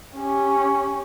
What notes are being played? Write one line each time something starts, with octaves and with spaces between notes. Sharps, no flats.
C#4 G4